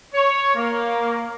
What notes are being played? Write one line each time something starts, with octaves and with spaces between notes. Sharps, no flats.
C#5
A#3